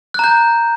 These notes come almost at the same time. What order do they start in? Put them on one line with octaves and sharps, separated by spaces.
F#6 A#5 G6